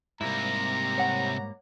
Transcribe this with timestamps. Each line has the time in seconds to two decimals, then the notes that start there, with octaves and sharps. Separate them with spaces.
0.21 G#2 C3 G3 A#3 E4 A#5
0.98 C#5 F#5